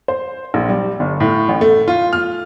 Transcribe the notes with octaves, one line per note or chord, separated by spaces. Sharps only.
C5
A#1
G3
G1
A2
A1
A3
F4
F6